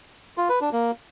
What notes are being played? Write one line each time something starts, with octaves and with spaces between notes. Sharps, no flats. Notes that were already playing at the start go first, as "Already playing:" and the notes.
F4
B4
D4
A#3